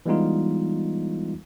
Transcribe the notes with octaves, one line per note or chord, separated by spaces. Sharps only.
E3 G3 G#3 B3 D#4 F4